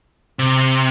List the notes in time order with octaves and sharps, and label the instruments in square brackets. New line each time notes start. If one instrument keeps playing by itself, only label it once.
[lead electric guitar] C3